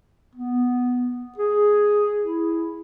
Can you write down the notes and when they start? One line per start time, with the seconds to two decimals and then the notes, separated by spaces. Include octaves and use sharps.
0.35 B3
1.38 G#4
2.23 E4